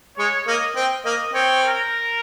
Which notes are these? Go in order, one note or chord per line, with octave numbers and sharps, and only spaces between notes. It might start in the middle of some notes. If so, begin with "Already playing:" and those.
G#3 C#5
A#3 D#5
C4
A#3 D#5
C4 C#5
A#4